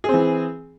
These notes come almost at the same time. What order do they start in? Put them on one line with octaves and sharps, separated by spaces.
G#4 C4 E3